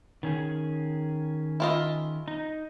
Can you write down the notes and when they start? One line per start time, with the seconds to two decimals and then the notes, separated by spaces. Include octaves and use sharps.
0.23 D#3 C#4 G#4
1.60 E4 F4 D#5
2.28 D#4